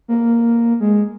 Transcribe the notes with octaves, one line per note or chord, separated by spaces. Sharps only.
A#3
G#3